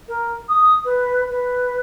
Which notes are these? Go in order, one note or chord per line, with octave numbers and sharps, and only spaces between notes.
A#4
D#6
B4
B4